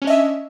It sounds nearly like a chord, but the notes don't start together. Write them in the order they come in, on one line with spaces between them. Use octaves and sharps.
C#4 D4 D#5 E5